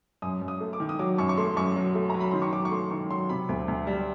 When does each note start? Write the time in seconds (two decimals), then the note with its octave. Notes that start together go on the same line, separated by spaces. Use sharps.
0.22 F#2 D#6
0.41 F#2
0.48 D#6
0.61 A3
0.73 D6
0.80 D#3
0.89 D#6
0.99 F#3 D6
1.18 F#2 C#6
1.29 C#6
1.37 A3 C6
1.57 F#2 C#6
1.76 F#3
1.95 A3
2.10 F#3 A#5
2.20 B5
2.31 D#3 C6
2.42 C#6
2.53 F#3 D6
2.65 C#6
2.71 A3 C6
2.91 D#3 C#6
3.10 F#3 C6
3.29 C3 B5
3.49 D2
3.68 D2
3.87 G3